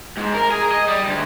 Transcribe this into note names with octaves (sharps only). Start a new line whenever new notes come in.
G#2
A#4
G#4
D#5
G3
D2